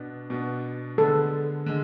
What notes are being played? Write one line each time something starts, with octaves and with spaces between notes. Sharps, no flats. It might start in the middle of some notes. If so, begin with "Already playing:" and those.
Already playing: B2 B3 D4
B2 B3 D4
D3 G#3 B3 A4
D3 G#3